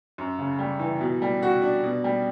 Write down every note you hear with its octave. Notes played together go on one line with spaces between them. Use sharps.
F#2
C#3
G3
E3
B2
G3
F#4
D4
B2
G3